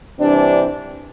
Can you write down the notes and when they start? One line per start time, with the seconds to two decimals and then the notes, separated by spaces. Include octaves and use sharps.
0.19 C3 E3 G3 C4 D4